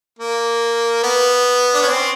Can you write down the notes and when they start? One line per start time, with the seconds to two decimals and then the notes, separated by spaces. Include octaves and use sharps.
0.19 A#3
1.03 B3
1.74 D4
1.81 C#4
1.88 C4